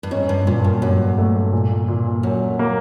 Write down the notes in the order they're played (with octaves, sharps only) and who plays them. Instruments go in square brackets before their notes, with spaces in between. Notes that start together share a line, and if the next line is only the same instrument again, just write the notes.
[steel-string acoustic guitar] G2
[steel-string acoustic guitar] G#2 [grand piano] C#4
[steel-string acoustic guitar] G2
[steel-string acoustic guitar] G2 [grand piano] A#2
[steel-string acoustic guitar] F#2
[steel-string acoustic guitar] G2 [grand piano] F#3
[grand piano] A3
A#2
A#2
[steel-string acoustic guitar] F#2 [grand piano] F#3
[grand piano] A#3